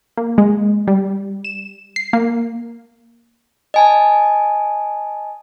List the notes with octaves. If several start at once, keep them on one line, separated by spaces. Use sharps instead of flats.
A#3
G#3
G3
E7
C7
A#3
D#5 G#5 A5